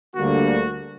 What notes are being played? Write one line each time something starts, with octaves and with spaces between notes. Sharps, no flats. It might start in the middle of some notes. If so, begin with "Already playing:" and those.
D2 D3 G3 A#3 F#4